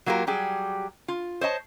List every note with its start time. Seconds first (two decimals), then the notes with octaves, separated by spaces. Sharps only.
0.06 F#3 A#3 F4 G4 A#4
0.27 F#3 G3 G4 G#4
1.08 F4
1.41 C5 C#5 D#5 A5